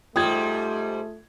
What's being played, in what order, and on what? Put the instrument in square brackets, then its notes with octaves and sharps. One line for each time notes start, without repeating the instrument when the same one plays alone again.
[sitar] G#2 G3 [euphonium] A3 [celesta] F4 D#6 [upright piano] G5 G#6